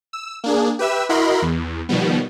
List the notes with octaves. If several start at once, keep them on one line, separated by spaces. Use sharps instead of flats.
E6
A#3 D4 G#4
G4 B4 E5 E6
E4 F#4 A#4 D#5 B5 C6
E2
B2 D#3 F3 G3 B3